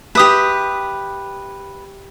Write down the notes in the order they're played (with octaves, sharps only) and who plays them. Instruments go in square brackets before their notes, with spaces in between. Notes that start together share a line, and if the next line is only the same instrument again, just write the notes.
[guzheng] G4 E5 [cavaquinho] B4 D#6